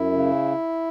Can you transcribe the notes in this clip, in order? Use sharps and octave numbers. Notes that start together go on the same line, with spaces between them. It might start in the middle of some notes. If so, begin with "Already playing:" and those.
Already playing: F#2 E4
C#3